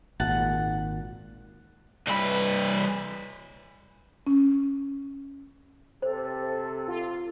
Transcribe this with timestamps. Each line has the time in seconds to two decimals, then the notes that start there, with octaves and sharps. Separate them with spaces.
0.20 G#1 A#2 F#5 A5
2.07 C2 B4
4.27 C#4
6.02 C3 A4 C5
6.88 F4